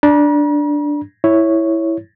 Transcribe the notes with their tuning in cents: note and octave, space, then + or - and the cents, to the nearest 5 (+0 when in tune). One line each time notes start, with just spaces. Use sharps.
D4 +0 A#5 +45
E4 +0 C#5 +0